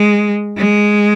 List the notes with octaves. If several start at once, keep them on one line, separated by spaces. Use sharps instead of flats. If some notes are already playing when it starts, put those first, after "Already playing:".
Already playing: G#3
G#3